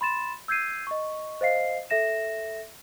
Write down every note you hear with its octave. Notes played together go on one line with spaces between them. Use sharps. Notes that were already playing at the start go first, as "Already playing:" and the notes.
B5 C6 A6 E7
E6 G6 G#6 C7 D#7
D#5 C#6
C5 D#5 F5 C7
A4 E5 A#6 E7